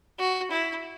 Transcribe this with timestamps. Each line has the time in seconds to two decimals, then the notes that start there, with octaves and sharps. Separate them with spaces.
0.19 F#4
0.51 E4